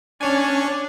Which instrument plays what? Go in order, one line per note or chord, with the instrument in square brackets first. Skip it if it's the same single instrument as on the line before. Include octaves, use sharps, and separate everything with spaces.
[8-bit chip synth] C#4 C#5 G#5 [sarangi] D4